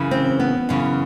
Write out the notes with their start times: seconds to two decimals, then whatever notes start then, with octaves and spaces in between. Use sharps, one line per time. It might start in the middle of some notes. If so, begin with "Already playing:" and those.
Already playing: F#2 C#3 E3
0.11 C4
0.40 B3
0.69 F#2 C#3 E3